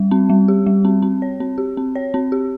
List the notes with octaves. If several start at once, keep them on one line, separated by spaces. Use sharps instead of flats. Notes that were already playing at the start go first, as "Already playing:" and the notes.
Already playing: G3
C4
G3
G4
G3
C4
C4
C#5
C4
G4
C4
C#5
C4
G4